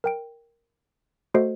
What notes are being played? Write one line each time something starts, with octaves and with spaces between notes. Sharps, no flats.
A#4 G5 D7
A3 F#4 A4 C5 D#5 C7